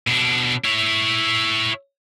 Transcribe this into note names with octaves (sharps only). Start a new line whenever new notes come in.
B2 D4
E4 C#5